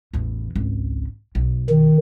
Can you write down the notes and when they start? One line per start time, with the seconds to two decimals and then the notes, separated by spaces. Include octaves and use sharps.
0.13 A1 E2
0.55 G#1 C#2
1.35 B1
1.70 D#3